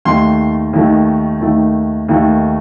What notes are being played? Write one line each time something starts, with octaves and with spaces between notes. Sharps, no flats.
D#2 D#3 A3 C6
D#2 D#3 A3
D#2 D#3 A3
D#2 D#3 A3